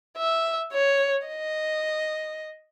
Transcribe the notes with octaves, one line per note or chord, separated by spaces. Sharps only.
E5
C#5
D#5